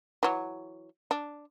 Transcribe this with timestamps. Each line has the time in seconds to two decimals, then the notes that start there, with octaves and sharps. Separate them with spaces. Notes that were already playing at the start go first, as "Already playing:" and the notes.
0.23 E3 F#3
1.11 D4